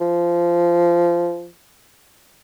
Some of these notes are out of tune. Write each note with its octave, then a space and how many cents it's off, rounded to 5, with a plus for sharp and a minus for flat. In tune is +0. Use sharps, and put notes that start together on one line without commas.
F3 -15